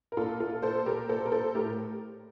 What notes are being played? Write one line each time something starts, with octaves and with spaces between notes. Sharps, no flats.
A#4
A#2 F4 A4
A#2 F4 A4
A#2 A4 C5
A#2 G4 A#4
A#2 A4 C5
A#4
A#2 A4 C5
A2 G4 A#4